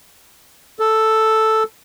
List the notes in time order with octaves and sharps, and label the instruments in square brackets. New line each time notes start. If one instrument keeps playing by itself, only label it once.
[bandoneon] A4